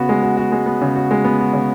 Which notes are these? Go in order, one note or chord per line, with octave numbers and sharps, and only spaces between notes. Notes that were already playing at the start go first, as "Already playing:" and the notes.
Already playing: C#3 B3 F#4
G#3
F#4
F#4
G#3
B3
C#3
F#4
G#3
B3
F#4
C#3